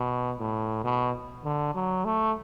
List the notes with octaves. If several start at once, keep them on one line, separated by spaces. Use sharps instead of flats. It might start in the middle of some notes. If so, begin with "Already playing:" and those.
Already playing: B2
A2
B2
D3
F#3
A3